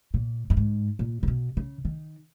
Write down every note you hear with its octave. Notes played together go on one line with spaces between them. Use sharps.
A#2
G2
G#2
A#2
C3
B2
C#3
D#3